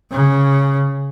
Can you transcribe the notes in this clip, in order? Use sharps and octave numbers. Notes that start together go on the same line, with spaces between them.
C#3